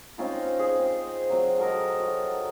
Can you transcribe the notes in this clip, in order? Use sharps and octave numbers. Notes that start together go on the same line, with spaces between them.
C4 C#4 D#4 F4
G#4
C4
F#3 C4
A4 A#4 D#5
F#4